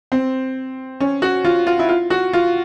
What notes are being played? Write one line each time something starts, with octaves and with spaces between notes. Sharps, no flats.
C4
C#4
F#4
F4
F4
E4
F4
F#4
F4